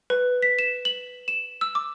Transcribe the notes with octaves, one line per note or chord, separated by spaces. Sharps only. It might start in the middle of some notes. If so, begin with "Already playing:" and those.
B4
B6
E7
F#7
E7
E6
D6